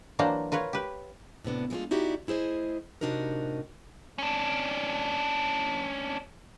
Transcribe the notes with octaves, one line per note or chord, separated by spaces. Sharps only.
E3 F#3 A#3 D4 C5 A#5
F4 A#4 B4 C#5
G4 B4
A2 C3 B3 D4
F3 G#3 A3 B3 D4 F4
D#4 E4 F#4 G4 D5
A3 E4 G#4 C5 D#5
A2 C3 D4 D#4 F#4 A#4
C#4 D4